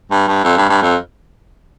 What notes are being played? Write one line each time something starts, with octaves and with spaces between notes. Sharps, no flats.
G2
G2
F2
G2
G2
F2